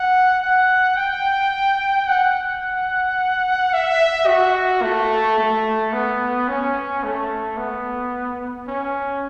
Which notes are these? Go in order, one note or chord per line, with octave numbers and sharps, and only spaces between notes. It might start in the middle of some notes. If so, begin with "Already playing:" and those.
Already playing: F#5
F#5
G5
F#5
E5
F#4
A3
A3
B3
C#4
A3
B3
C#4